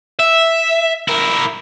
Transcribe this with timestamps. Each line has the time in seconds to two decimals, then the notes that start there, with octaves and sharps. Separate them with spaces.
0.19 E5
1.08 E4 A#4